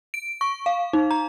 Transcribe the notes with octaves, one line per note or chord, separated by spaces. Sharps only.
D7
C#6
F5
D#4
A#5